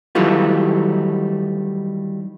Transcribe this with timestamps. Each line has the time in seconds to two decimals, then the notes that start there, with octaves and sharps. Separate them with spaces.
0.15 D#3 E3 F#3 G3 A3 F4